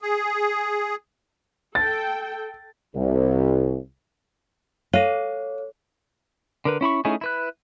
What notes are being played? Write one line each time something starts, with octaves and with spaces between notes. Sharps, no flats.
G#4
A4 G5 A6
C2
A4 C#5 F5
D3 A#4 B4
C#4 E4 B5 C#6
A3 C#4 D#4 E4 G#4
E4 B4 F#6